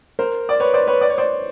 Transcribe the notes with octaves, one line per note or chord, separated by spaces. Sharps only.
A#4 C5
D5
B4 C#5
C5 D5
B4 C#5
D5
C#5
C5 D5